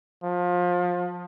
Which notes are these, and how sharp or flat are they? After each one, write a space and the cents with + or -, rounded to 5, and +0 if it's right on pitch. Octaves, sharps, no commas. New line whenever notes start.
F3 +25